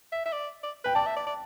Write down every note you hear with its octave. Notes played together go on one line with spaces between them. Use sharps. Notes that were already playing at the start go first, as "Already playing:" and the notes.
E5
E5
D5
D5
B4 G5
D5 A5
E5
D5
D5